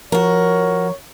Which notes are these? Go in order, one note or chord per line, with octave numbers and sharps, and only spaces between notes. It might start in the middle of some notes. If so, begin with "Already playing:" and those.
F3 F#4 A#4 C#5